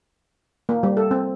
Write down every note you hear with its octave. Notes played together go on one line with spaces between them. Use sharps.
A#3
G3
A4
C4